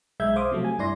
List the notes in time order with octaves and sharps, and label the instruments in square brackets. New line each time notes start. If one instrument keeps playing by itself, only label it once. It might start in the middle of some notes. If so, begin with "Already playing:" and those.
[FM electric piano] B1 G#3 E5 G6 G#6
C5 E5 F5 D6 D#6
C3 F3 F#3 A3
G#5
G2 E4 D5 C6 A#6